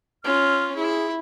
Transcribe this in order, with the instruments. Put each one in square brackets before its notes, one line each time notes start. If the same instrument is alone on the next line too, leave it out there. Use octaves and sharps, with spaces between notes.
[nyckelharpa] C#4 F4 [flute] F6
[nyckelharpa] E4 [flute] G#4